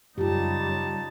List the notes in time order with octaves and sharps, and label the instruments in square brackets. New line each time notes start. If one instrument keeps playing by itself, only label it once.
[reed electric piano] F#2 [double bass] C#3 G3 [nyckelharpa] D#4 A5 [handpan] F4 G4